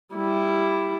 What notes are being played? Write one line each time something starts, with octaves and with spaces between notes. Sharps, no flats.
G3 E4